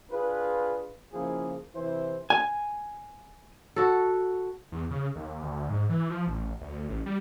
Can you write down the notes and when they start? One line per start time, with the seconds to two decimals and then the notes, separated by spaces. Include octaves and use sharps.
0.10 D4 F4 G#4 B4
1.13 C#3 F3 A#3 E4 G#4
1.74 C3 E3 E4 C5
2.30 G#5
3.76 F#4 A4
4.72 E2
4.91 C#3
5.16 D#2
5.42 D2
5.69 G#2
5.89 E3
6.10 F3
6.27 A1
6.61 D2
6.89 A1
7.06 G3